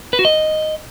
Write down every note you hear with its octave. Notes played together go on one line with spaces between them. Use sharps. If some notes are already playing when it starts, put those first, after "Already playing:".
B4
F#4
D#5